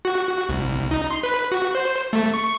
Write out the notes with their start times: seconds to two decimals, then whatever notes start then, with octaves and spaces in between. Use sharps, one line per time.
0.05 F#4
0.28 F#4
0.49 C2
0.91 D#4
1.11 C6
1.23 B4
1.52 F#4
1.75 C5
2.13 A3
2.34 C#6